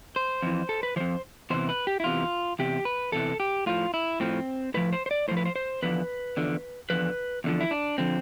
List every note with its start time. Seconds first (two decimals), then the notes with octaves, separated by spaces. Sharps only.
0.16 C5
0.43 F2 E3
0.69 A4
0.83 B4
0.96 F2 E3 C5
1.50 E2 C3 E3 C5
1.69 B4
1.87 G4
2.00 E4
2.04 E2 C3 E3 F4
2.59 E2 C3 G4
2.85 B4
3.12 E2 C3 E3 A4
3.40 G4
3.66 A2 F3 F4
3.94 E4
4.20 A2 F3 C4
4.74 A2 F3 B4
4.93 C5
5.06 C5
5.11 D5
5.28 A2 F3 C5
5.37 B4
5.45 C5
5.56 C5
5.83 E2 D3 F3 B4
6.37 E2 D3 F3
6.90 E2 D3 F3 B4
7.44 E2 D3 F3
7.61 E4
7.71 D4
7.98 D3 F3 C4